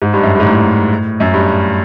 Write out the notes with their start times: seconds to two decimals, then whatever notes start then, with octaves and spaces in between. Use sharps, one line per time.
0.02 G#2
0.13 G2
0.23 F#2
0.35 G2
0.40 G#2
0.46 A2
1.20 F#2
1.33 G2